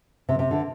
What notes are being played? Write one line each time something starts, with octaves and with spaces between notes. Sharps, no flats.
C3
C3
D3